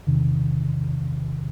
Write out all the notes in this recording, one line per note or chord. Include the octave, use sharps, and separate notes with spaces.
E2 C3 D#3